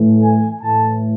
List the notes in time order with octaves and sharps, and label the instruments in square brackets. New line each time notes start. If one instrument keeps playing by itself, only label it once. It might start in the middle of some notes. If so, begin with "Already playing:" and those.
Already playing: [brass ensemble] A2 E3 A3
G#5
A2 E3 A3 A5